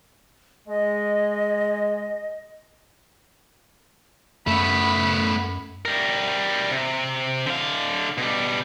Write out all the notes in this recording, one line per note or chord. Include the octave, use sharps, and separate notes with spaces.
G#3 D#5
F#2 A3 B3 B5
G3 A#4
C3
D3 F5
B2 G3